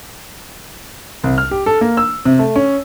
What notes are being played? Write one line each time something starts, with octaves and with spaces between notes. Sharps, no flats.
C2
F6
G4
A4
A#3
E6
C3
A3
C#4